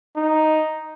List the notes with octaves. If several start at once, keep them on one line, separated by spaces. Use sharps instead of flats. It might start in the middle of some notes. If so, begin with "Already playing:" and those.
D#4